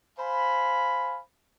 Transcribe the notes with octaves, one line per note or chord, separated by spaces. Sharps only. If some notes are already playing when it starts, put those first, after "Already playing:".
C5 F5 G#5 B5